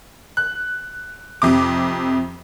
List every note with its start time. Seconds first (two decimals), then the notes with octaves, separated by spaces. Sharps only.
0.37 F#6
1.42 F2 C3 D6